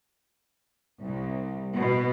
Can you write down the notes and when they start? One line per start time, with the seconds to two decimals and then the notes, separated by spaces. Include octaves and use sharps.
1.00 C2
1.75 B2